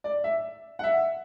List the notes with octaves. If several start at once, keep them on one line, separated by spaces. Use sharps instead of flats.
D5
E5
F#5
E5